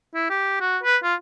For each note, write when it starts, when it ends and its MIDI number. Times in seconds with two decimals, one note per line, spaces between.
0.15 0.25 64
0.30 0.57 67
0.60 0.78 66
0.83 0.97 71
1.04 1.14 65